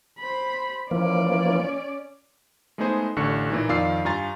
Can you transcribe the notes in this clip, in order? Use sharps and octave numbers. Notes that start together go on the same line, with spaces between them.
C5 B5
E3 F3 A#3 C#4 D5
G#3 A3 B3 D#4 G#4 C5
A1 D3 C#6 C#7
A#2 E3 D#4
F2 D#3 F4 D5 E6 C7
G2 F4 G#5 A#5 C6 A6